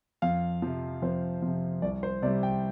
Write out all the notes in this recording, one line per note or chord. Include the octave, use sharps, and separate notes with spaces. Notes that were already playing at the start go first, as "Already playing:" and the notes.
F2 F5
C3 F3
F2 C5
C3 F3
C2 D5
C5
C3 G3 D5
G5